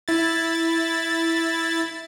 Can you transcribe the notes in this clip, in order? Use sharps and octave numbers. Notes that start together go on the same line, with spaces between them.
E4 A6